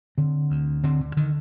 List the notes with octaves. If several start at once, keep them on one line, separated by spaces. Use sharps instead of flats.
D3 C4
D2
D3 C4
D3
D3 D#3